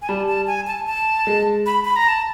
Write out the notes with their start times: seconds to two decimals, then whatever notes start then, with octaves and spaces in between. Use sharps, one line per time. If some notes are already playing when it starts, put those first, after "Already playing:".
0.02 G#5
0.09 G3 A5
0.28 A5
0.47 G#5
0.67 A5
0.87 A5
1.27 G#3
1.66 B5
1.85 B5
1.96 A#5
2.08 A5